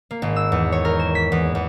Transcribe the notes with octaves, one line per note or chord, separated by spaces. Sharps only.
A#3
G#1
E6
E2
C#5
A#4
E7
B6
E2
E2